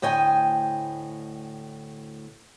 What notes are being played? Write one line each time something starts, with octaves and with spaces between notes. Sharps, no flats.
D2 A2 D#5 G5 G#5